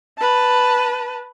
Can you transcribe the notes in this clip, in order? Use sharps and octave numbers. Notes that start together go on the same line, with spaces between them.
B4 A5